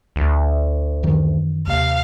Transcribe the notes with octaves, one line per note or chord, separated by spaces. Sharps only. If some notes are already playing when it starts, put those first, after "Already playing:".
D2
F#2 D#3 E3
D#2 C3 F5